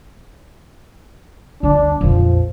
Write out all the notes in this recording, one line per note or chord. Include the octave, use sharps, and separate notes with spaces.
G1 D2 D4
A#1 F2 F3